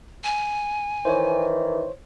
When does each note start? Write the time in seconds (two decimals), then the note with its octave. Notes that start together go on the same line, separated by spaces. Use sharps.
0.24 G#5
1.05 D#3 E3 C5 C#5